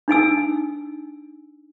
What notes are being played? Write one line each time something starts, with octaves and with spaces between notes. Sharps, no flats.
D4 D#4 G#5 E6